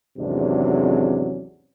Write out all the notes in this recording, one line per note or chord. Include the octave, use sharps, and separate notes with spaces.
G#1 E2 C3 F#3 C#4 D4